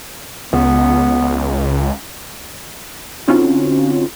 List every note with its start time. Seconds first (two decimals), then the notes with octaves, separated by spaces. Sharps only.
0.53 C#2 B3
3.28 D3 C4 C#4 D#4 F4 F#4